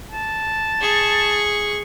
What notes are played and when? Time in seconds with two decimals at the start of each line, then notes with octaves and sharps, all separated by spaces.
0.11 A5
0.81 G#4 C#6